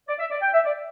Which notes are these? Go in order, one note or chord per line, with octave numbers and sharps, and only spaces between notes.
D5
E5
D5
G5
E5
D5